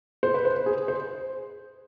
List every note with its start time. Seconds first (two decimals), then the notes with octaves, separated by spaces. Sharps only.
0.23 C5
0.34 B4
0.45 C5
0.66 G#4
0.88 C5